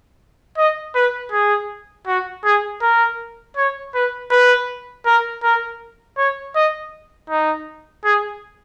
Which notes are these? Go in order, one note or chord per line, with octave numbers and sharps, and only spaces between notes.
D#5
B4
G#4
F#4
G#4
A#4
C#5
B4
B4
A#4
A#4
C#5
D#5
D#4
G#4